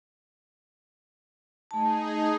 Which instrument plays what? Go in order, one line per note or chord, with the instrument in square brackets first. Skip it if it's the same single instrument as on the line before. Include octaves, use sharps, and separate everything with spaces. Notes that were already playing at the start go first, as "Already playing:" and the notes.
[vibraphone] A3 A5 [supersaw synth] D#4 G#4